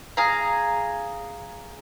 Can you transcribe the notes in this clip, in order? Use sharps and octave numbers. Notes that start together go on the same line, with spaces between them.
G#4 F5 A#5